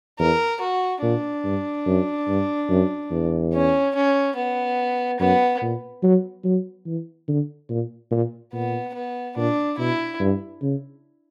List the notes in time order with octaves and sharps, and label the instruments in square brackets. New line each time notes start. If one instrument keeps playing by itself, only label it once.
[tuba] E2 [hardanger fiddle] A#4
[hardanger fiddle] F#4
[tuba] A#2 [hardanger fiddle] D4
[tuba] G2
F#2
G2
F#2
E2
[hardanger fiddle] C#4
C#4
B3
[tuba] F#2 [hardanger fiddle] B3
[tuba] A#2
F#3
F#3
E3
D3
A#2
A#2
[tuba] A#2 [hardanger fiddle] B3
[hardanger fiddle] B3
[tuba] A#2 [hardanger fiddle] D4
[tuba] B2 [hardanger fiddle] E4
[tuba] G2
C#3